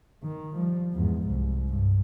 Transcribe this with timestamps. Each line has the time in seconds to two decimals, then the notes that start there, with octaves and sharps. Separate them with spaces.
0.23 D#3
0.56 F3 G3
0.93 E2 G#2
1.28 C2
1.69 G2